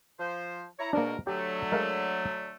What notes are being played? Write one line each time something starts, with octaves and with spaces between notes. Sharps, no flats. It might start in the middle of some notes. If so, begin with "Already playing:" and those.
F3 C5
E4 C#5 A#5
G#2 B2 A#3 D4 A#4
D3 F#3 A3 G4
G#3 A#4 F5